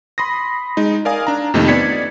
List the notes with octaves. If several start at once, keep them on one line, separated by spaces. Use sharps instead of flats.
B5 C6 D#6 A#6
G#3 D#4
A#4 D5 F5 G#5 D#6
D4 A#5
F2 C3 D#3 A3 A#3 D#4
B3 D5 G#6 B6 C#7